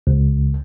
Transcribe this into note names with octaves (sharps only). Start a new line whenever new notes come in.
C#2